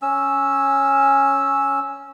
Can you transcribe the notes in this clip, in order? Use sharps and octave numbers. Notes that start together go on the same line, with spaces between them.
C#4 E6